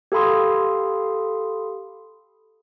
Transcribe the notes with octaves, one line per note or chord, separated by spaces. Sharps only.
G4 A4 F5 B5 C6 D#6